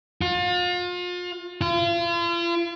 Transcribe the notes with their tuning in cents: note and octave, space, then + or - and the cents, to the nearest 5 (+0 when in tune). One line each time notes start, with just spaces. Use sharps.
F4 +35
F4 -40